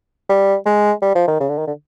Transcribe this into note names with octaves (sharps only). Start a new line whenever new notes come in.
G3
G#3
G3
F3
D#3
C#3
D3
D#3
D3